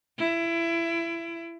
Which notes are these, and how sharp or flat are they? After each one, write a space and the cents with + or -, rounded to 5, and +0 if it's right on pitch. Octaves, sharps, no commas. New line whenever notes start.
E4 +25